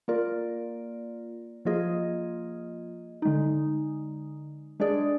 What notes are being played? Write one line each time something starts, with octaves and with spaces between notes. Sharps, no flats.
A#3 F4 A#4 D5
F3 A#3 F4 G#4 D#5
D3 G#3 D#4
G#3 D4 G#4 D5